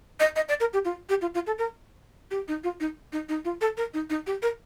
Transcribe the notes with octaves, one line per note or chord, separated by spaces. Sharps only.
D#5
D#5
D5
A#4
G4
F4
G4
F4
F4
A4
A#4
G4
D#4
F4
D#4
D#4
D#4
F4
A4
A#4
D#4
D#4
G4
A#4